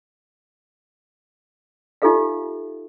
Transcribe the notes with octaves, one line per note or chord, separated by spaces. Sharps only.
D#4 F4 G4 A4 E5 F5